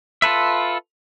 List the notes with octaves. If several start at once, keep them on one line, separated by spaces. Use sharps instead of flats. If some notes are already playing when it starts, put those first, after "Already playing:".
F4 A4 B4 E5